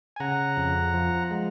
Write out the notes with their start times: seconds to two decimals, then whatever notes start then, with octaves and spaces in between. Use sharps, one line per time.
0.16 G#5
0.20 C#3 F#5 A#5
0.57 F2
0.94 F3
1.31 G#3